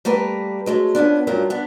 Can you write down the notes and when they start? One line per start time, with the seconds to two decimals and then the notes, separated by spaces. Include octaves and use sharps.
0.05 G3 A3 A#3 A#4 B4
0.66 F#3 G#3 A3
0.95 F3 B3 C#4 D4
1.27 G2 F#3 A3 C#4 F4 A#4
1.50 B3 D4